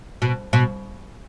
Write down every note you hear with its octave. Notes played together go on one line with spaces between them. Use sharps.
B2
B2